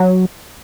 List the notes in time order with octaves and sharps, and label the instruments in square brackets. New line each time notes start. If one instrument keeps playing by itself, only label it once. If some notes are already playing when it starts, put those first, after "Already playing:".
Already playing: [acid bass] F#3